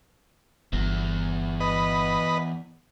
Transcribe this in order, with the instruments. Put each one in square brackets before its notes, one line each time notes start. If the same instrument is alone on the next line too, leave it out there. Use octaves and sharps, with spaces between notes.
[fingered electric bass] G1 [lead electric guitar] E2
[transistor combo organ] B4 D#5